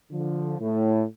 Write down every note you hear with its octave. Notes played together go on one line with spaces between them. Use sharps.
D3 F3
A2